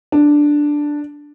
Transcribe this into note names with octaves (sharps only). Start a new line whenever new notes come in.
D4